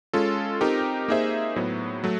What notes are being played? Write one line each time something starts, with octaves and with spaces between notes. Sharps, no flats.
G#3 C#4 F4 A4
C4 D#4 G4 A#4
A#3 D#4 G#4 C5 E5
A2 F#3 B3
F#3 A3